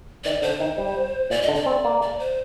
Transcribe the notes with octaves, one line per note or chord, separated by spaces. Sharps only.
D#3 D5
D3 C5
D#3
G3
A#2 D5
D#5
D3
D5
C4
A#3
D5
C5